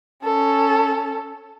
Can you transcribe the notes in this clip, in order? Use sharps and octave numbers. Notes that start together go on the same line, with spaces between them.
C#4 A4